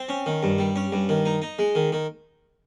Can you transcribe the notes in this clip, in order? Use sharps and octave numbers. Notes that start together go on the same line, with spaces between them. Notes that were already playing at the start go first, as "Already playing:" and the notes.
Already playing: C4
C#4
D#3
G2
G3
C#4
G2
D#3
D#4
D#4
G#3
D#3
D#3